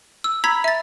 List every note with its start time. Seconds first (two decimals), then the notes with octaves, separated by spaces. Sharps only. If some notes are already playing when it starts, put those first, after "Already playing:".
0.24 E6
0.44 A#5 B5 E6 G#6 B6
0.64 E5 A6